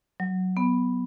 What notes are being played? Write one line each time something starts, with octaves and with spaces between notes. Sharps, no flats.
F#3
B3